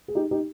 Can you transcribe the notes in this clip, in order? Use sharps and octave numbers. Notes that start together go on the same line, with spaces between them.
G#4
D#4 G4
D#4 G4